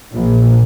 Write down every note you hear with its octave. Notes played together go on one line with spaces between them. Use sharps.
A#1